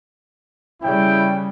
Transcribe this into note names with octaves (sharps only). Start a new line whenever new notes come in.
C#3 G3 E4 G5